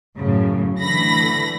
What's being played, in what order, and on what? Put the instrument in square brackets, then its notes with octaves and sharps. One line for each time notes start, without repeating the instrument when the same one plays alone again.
[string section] F#2 A2 C#3
D3 E3 A3 B5 A#6